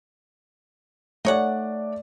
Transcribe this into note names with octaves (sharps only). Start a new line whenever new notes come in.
A3 D#4 C#5 D5 F#5